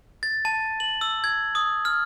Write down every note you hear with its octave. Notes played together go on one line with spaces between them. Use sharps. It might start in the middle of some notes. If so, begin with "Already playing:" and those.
A6
A5
F#7
E6
G#6
D#6
F6